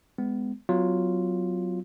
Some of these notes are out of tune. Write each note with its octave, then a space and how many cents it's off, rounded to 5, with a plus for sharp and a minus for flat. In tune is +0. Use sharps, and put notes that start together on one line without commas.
G#3 +0 B3 +25
F#3 +0 B3 +40 F4 +0